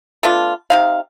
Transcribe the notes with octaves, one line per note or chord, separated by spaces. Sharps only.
A3 B3 D4 F4
C3 D#4 F5